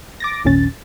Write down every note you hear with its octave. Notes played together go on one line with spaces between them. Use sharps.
D6 A6 A#6
G#1 D#2 A#2 C#4 A6